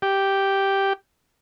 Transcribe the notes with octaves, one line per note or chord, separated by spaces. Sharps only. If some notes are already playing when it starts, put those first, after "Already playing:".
G4